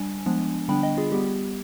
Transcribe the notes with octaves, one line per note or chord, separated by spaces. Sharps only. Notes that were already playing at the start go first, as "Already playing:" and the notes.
Already playing: G3 D4 G#5
F3 G#3 B3 D4
D3 G3 B3 D4 G5 B5
D#5 G5
F4 G#4
G3 B3 G4